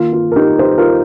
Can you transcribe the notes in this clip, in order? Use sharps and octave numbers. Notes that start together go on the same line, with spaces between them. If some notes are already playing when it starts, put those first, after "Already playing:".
Already playing: D#3 A#3 F4
F4
A#4
D#4 G4
G4 C5
F4 A#4